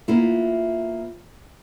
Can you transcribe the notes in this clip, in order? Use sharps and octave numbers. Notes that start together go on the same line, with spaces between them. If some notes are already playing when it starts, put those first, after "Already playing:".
A#3 B3 E4 F4